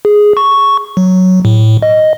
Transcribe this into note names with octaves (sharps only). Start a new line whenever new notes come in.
G#4
C#6
F#3
A2
D#5